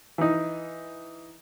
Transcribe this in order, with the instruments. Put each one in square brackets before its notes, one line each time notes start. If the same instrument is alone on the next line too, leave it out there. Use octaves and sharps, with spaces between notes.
[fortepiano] E3 D#4